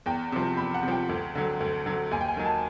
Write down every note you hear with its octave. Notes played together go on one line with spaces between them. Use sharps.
E2 G5
C3 F3
E2 B5
F#5
C3
F3 G5
D2
D3 F#3
D2
D3 F#3
D#2 G#5
G5
G#5
D#3 F#3
A5